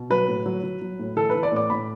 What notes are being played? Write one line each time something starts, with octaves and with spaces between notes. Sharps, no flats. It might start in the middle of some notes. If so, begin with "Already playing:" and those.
Already playing: B2
F#3 B4
A2
F#3
F#3
F#3
A2
E3 A4
E3 B4
D5
A2 D6
A2 B5